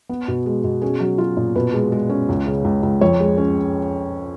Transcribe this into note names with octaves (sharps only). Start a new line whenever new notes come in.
B3
B2
G#3
B2
C#4 G#4
F#3
F#3 F4
A#2
B2 B4
G#3
G#3
C#4
C#2
C#3
C#2
C#2
F2 C#5
G#3
C#4